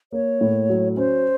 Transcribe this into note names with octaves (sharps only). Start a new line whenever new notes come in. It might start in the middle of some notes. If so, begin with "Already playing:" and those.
A#3 C#5
A2
F#3
C#4 C5